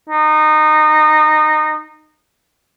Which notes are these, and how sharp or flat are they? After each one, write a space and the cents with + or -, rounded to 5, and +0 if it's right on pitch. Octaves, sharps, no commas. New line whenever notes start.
D#4 -20